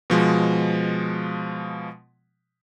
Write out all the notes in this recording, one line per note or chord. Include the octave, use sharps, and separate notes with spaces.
B2 F3 G#3